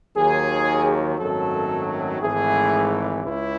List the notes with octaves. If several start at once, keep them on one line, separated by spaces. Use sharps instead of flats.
D#2 D#3 F#3 G#4
G#1 F#2 D#3 F#3 A3 A4
G#1 G#2 E3 A3 G#4
C#2 C#3 E4